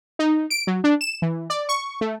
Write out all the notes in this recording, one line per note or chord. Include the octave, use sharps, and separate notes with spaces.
D#4
D7
F#3
D4
E7
E3
D5
C#6
A3